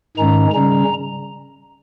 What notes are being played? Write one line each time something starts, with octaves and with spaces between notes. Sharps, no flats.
G#2 D#3 G#3 C#4 A#5
C#3 G3 C#4 A#5